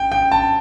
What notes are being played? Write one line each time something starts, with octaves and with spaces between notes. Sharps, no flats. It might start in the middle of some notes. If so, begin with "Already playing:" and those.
Already playing: G5
G5
A5